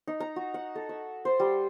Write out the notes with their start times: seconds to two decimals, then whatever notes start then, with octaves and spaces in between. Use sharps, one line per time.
0.08 D#4
0.20 A#5
0.36 F#4
0.54 F#5
0.75 A4
0.89 E5
1.25 C5
1.40 G3